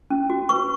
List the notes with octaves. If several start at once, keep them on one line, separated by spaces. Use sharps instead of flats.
C#4
F#4
B4 C#6